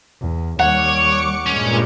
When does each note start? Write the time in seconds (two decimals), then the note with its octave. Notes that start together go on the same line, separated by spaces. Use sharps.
0.21 E2
0.60 D#2 G3 C#5 F#5 C#6 D6 C#7
1.47 G2 A#2 G#3 C#4